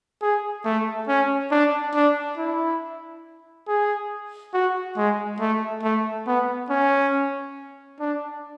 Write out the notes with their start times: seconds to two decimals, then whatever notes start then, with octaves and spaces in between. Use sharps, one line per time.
0.22 G#4
0.65 A3
1.08 C#4
1.51 D4
1.94 D4
2.38 E4
3.68 G#4
4.54 F#4
4.97 G#3
5.40 A3
5.83 A3
6.27 B3
6.70 C#4
8.00 D4